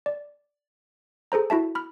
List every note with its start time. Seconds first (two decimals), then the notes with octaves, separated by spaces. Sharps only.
0.06 D5
1.32 G#4 A4 C5 A#5
1.50 E4 F#4 E5 A5
1.75 B5 F6